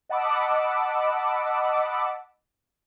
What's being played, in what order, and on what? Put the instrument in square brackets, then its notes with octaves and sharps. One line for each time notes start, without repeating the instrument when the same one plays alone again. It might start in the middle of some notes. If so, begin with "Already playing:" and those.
[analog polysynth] D#5 F#5 A5 B5 D6 E6